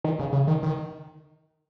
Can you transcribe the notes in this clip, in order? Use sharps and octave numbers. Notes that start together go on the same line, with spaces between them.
D#3
C#3
C#3
D#3
D#3